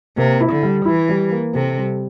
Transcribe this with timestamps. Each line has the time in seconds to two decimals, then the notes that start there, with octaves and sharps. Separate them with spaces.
0.17 C3 A#3
0.41 E4
0.52 D3
0.63 G3
0.85 E3 E4
1.09 G3
1.31 A#3
1.54 C3 A4
1.77 G3